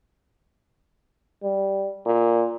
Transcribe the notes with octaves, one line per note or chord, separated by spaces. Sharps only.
G3
A#2